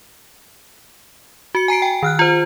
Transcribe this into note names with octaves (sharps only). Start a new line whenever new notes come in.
F#4 C#7
G#5 A#5 C7 D7
G5
D#3 F6 F#6
F4 C5